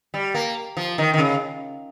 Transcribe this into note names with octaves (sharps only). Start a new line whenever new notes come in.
G3
A#3
F3
D#3
D#3
C#3